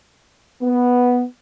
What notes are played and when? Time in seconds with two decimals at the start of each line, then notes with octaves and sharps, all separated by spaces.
0.62 B3